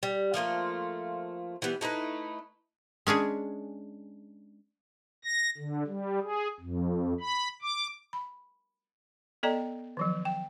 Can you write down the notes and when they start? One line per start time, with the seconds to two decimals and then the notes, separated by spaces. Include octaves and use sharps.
0.03 G3
0.34 F3 A3 A#3 F4
1.62 E3 G3 B3
1.81 A3 D#4 E4 B4
3.07 G#3 C#4 D4 G#4
5.25 A#6
5.58 D3
5.87 G3
6.22 G#4
6.60 F2
7.21 B5
7.62 D6
8.13 B5
9.43 B3 A4 D5 D#5 G5 A#5
9.97 D#3 F3 F#3
10.25 G5